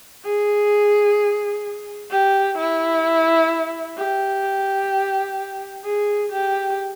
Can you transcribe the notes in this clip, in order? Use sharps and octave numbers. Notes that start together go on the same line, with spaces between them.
G#4
G4
E4
G4
G#4
G4